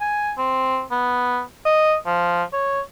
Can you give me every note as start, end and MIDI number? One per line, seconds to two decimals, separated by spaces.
0.01 0.32 80
0.38 0.83 60
0.91 1.41 59
1.65 1.95 75
2.06 2.43 53
2.53 2.81 73